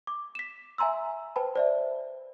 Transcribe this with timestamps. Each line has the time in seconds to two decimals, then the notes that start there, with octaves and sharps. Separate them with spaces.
0.07 D6
0.35 B6 E7
0.78 E5 G#5 A#5 C6 E6
1.36 B4 C5 G5 A5 B5
1.56 C5 D5 E5